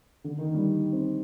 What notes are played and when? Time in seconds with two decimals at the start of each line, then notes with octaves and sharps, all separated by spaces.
0.24 D3
0.38 D#3
0.54 G3
0.93 C4